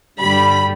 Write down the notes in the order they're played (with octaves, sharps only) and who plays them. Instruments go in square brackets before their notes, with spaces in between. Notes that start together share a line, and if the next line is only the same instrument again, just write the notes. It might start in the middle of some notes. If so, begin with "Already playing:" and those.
[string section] G2 D3 G3 B5